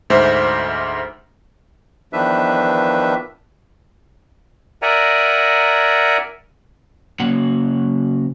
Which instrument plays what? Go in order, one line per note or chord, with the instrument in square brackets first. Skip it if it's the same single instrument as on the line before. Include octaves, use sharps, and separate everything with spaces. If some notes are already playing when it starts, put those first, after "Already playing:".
[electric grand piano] D2 G#2 C5 E5
[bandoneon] E2 D#3 F3 D4 B4 E5
A#4 D5 E5 F#5 G#5 A#5
[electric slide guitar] C#3 F#3 A#3 F#5